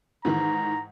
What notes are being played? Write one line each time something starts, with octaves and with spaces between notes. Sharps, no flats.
G#2 D#3 E3 A#5